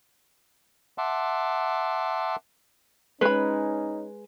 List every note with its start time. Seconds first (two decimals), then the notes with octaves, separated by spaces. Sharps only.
0.98 E5 F#5 A5 C6 D6
3.21 G#3 C#4 D#4 B4 B5